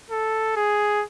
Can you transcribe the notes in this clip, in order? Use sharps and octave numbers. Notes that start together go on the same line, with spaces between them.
A4
G#4